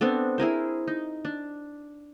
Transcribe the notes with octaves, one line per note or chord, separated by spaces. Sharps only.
B3 C4 D4 A4
E4 G#4 A#4 C5
D#4
D4